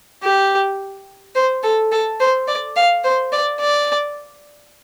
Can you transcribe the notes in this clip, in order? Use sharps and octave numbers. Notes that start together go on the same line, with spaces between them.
G4
C5
A4
A4
C5
D5
F5
C5
D5
D5